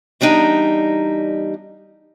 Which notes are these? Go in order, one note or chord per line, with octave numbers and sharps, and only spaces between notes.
E2 G3 D4 D#4 A#5